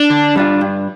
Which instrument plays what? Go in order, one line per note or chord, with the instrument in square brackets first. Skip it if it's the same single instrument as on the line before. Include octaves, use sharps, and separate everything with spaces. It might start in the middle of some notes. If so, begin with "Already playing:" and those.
Already playing: [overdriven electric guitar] D4
[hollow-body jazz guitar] D3
G3 D4 F4
G2